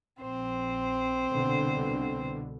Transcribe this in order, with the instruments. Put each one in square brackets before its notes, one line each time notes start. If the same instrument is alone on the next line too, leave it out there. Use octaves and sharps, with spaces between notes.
[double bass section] A#1 [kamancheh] C4 C5
[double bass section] C2 B2 D3